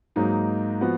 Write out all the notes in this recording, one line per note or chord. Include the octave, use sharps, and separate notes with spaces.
G#2 F#3 A#3 D#4
F3 B3 F#4